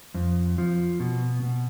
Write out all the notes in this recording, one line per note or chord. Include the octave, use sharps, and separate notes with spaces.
F2
F3
B2
B2